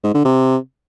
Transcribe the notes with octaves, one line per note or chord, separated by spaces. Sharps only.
G#2
D3
C3